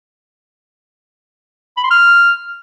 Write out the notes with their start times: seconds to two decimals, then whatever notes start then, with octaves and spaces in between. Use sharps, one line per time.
1.77 B5
1.84 C6
1.90 F6